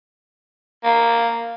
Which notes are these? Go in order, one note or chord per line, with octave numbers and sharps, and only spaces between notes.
A#3